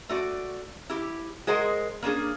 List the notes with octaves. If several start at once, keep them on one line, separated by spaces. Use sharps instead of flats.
A3 F#4 D5
E4 G4
G#3 G#4 A#4 C5 D#5 F#5
A#3 C#4 D4 G#4